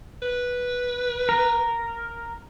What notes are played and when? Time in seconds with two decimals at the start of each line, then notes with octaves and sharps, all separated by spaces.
0.22 B4
1.29 A#4